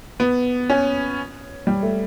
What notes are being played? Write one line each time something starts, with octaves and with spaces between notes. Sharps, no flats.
B3
C#4
G3
A3